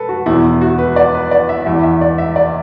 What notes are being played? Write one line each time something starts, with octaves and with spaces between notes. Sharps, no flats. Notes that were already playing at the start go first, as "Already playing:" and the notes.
Already playing: A4 B4
F#4
E2 B2 E4
E4
F#4
B4
D5
B4
D5
E5
E2 E3 E5
E5
D5
E5
D5